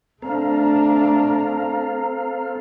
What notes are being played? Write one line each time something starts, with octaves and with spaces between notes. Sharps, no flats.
A3 C4 D4 A4 F5 A#5